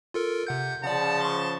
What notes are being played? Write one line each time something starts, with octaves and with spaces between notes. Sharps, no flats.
F4 A4 A#4
C3 F#5 G6
C#3 F3 D5 F#5 A5
C6 C#6